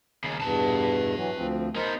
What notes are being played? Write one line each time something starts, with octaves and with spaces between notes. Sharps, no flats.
D#2 C#3
E2 G2 B2 B4 A5
E3 F#3
D2 F3 C4
B3 D#4 A#4 C5